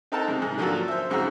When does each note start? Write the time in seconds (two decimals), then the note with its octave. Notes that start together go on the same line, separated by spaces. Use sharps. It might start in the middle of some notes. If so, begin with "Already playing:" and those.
0.12 C4 D#4 A4 A#4 F#5 A5
0.28 G#2 C3
0.42 G#2
0.58 D3 F3 F#3 A#3 F#4 A4
0.88 C5 E5
1.10 F2 G#2 C#3 F#4 A#5 E6